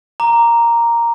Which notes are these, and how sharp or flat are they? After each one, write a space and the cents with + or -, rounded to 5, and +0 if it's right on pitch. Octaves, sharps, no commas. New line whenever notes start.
A#5 +0 D6 +0